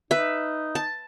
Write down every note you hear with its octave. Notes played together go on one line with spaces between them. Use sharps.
D#4 B4 E5
A5